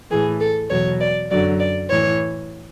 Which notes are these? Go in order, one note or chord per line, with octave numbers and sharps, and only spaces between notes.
A2 E3 G#4
A4
E2 B2 F#3 C#5
D5
F#2 D3 F#3 D5
D5
A2 E3 C#5